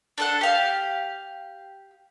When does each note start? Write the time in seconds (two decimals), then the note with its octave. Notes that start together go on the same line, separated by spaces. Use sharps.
0.18 D4 A4 F#5
0.41 G4 F5